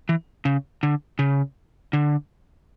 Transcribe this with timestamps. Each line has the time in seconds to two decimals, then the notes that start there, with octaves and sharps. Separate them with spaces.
0.09 E3
0.45 C#3
0.83 D3
1.19 C#3
1.93 D3